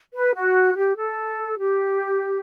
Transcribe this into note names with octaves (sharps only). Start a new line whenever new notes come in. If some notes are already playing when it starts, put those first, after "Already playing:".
B4
F#4
G4
A4
G4